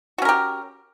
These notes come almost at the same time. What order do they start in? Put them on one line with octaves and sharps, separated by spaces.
F#4 C#4 A#4 G4